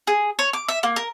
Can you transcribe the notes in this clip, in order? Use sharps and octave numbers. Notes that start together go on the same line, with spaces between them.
G#4
C#5
D6
E5
A#3
A#4